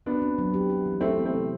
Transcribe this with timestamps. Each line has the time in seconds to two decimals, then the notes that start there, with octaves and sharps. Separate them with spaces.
0.06 B3 D4 F#4
0.22 C4
0.38 F#3
0.54 G4
0.70 E4
0.86 E3
1.01 A3 C4 E4
1.18 B3
1.25 A3 C4
1.33 C3